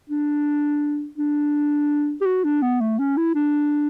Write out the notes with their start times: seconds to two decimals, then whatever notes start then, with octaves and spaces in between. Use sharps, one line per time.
0.10 D4
1.18 D4
2.21 G4
2.26 F#4
2.44 D4
2.62 B3
2.81 A3
2.99 C#4
3.17 E4
3.35 D4